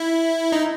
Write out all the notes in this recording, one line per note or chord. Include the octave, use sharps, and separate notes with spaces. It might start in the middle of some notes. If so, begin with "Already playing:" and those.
Already playing: E4
D#4